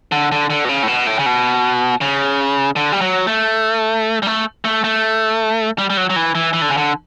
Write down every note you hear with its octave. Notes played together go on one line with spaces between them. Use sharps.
D3
D3
D3
B2
C#3
A2
B2
A2
C#3
B2
C#3
D3
G3
F#3
A3
G3
A3
A3
A3
G3
G3
F#3
F#3
E3
E3
E3
D3
C#3
D3